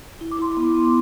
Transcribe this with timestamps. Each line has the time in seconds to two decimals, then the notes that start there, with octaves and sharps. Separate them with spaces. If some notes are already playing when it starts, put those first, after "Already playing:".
0.21 E4
0.32 D6
0.39 E4 C6
0.52 D6
0.57 B3
0.74 B3